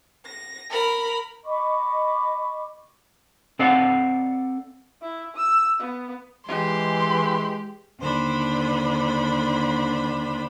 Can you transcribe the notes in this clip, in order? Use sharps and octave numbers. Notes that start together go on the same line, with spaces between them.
A#6
A#4 B5
D#5 B5 C#6 D6
C4 A4 D5 F5 F#5
E4
E6
B3
E3 G#3 G4 C6
D#2 D3 D4 C5 B5